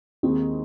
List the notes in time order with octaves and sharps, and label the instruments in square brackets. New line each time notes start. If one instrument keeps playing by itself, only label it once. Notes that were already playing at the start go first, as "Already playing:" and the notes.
[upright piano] D#2 D#3 G#3 D#4 [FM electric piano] C4